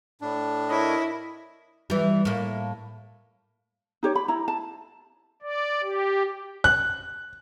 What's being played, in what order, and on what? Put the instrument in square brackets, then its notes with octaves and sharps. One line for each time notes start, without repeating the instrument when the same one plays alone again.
[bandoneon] A2 D4
[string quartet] E4 [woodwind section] A#4 C#5 D#5
[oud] E3 G3
A2 A#3
[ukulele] D#4 G4 C#5
B5
E4 A#5
A5
[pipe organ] D5
G4
[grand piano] F#6